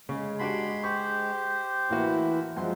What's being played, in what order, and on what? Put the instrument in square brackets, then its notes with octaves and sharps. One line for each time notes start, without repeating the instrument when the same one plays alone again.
[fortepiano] C#3 [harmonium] G#3
[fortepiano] D4 F#4 G4 [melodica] B5 C6
[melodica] G4 C5 [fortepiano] C#6
[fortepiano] A2 A#3 F#4 [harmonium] E3 E4
[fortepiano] F#2 C6 [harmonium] F3 G#3